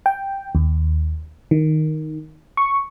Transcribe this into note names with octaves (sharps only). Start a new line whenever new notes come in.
G5
D#2
D#3
C#6